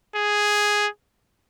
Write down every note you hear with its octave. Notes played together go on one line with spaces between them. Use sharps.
G#4